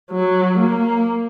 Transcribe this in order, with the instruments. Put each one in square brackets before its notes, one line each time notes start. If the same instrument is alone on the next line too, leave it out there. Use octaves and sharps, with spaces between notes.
[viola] F#3
A#3